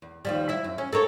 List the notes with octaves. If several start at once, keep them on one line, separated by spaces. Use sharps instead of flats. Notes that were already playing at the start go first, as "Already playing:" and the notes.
E2
D#2 F3 G3
E4 E5
F#2
C#4
A4 A#4 C#5